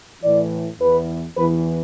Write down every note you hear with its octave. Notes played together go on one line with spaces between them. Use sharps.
A2 E3 D5
E2 E3 B4
E2 E3 B4